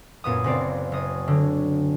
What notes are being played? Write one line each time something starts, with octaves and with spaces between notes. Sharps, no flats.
F#2 A#2 B3 D#6
F#1 B3 C4 D5
F#1 D#6
D3 F#3